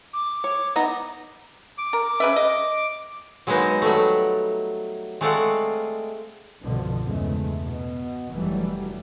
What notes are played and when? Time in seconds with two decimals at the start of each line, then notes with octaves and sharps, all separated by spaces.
0.14 D6
0.44 C#5
0.76 B3 D#4 D#5
1.78 D6
1.93 A#4
2.20 C#3 B4 E5
2.36 D#5
3.47 F#3 G#3 A#3 B3 D#4 C5
3.82 F#3 G3 A3
5.21 G#3 A3 C4 D5 F5 F#5
6.62 C2 G2 B2 D3 F3
7.05 E2 C#3 G#3 A3
7.65 B2
8.31 F1 F#2 E3 F#3 G3 A3